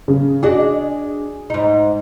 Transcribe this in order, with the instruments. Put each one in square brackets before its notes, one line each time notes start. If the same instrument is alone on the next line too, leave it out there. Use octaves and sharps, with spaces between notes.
[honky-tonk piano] C#3
[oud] D4 F#4 D#5 [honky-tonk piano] G#4
[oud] G#2 D#4